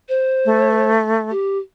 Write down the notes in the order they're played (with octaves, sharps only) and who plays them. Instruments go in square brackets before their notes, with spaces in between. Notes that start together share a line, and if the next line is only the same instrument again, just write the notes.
[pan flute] C5
[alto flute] A3
[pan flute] G4